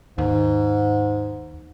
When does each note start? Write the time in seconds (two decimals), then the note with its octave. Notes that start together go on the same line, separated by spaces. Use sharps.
0.18 D#2 G#2